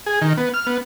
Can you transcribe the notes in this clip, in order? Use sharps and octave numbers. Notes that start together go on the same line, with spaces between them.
G#4
D#3
B3
F6
B3